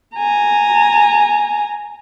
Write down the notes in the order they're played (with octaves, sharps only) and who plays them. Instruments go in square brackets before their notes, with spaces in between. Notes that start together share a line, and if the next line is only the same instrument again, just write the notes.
[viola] G#5 A#5